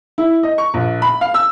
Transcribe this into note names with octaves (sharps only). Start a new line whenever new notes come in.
E4
D#5
C#6
A#1
B5
F5
E6